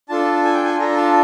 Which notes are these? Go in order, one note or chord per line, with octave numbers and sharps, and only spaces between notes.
D4 F4 A4 A5
G#5
G5
G#5
D4 F4 A4 A#5
A5